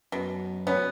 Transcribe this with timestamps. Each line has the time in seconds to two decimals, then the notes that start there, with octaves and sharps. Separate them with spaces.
0.12 F#2 B2
0.67 B3 C#4